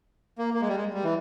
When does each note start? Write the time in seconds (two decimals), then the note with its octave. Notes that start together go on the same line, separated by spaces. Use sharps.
0.38 A#3
0.54 A#3
0.61 G#3
0.68 G3
0.76 G#3
0.93 G3
1.03 E3